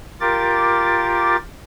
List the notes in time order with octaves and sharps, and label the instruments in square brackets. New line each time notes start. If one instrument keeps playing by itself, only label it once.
[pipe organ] F4 G4 A#4 D6 A6